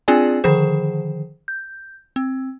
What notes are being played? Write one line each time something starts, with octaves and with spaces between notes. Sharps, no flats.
C4 D4 F4 G#4 D5 G#5
D3 D#3 F3 G#4 C5
G6
C4